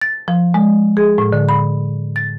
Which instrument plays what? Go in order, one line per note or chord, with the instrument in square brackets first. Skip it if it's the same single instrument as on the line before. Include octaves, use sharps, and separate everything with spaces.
[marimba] A6
F3
G#3
G#4
A2
D3
B5
A6